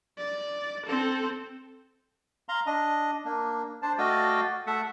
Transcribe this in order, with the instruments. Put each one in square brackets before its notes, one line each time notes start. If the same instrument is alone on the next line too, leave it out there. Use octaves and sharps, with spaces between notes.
[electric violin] D5
C4 A4
[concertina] F5 A#5 C6
D4 D#5
A#3 D4
D4 C5 D5 A5
A3 F#4 D5 D#5 F5 G5
A3 E5 F#5